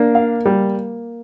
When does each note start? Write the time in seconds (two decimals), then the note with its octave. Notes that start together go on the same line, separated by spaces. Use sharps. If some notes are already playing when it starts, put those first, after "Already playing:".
Already playing: A#3 D4
0.15 F5
0.46 G3